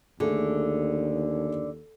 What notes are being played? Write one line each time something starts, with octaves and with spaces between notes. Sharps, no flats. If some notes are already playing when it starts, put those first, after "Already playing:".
D#2 D3 A3 G#4